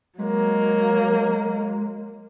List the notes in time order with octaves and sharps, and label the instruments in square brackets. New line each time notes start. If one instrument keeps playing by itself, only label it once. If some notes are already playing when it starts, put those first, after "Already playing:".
[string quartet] F#3 A#3 [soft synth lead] G#3